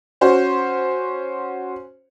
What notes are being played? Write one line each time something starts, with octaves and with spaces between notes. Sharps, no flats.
C#4 F#4 C5